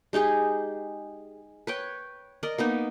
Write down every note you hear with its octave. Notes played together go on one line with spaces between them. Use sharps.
G#3 D#4 G4 G#4
B4 C#5 G5
A#4 D5 D#5
A#3 B3 D#4